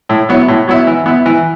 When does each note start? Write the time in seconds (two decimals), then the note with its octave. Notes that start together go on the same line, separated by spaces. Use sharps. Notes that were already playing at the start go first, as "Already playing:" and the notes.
0.09 A2
0.29 F#3 B3 E4
0.48 A2
0.67 F#3 B3 E4
0.87 E3
1.06 B3 E4
1.26 E3